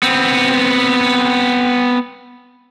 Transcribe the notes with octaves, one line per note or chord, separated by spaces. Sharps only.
B3 C4